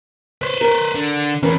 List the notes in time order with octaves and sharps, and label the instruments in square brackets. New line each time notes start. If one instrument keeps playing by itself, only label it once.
[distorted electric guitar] B4 C5
[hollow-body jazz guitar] A#4
[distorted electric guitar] D3
[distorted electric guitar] E2 [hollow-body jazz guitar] C#4 A#4 B4